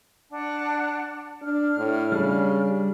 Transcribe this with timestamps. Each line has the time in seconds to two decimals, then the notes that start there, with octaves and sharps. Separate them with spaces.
0.31 D4 F#5 A5
1.42 D4 F6
1.78 A2
2.12 C#3 G3 D4